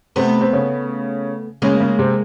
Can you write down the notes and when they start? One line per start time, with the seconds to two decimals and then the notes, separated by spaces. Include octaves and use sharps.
0.16 C3 A3 B3 C4
0.41 C4
0.53 C#3 C#4
1.62 C#3 G#3 A#3 C#4
1.80 C#3 C#4
1.99 C3 C4